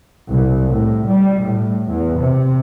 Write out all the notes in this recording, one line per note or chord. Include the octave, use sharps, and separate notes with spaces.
C2
A2
G3
A2
E2
C3